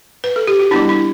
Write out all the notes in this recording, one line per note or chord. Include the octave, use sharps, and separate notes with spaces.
B4
A4
G4
F#4
G3 B3 D4 E4
E4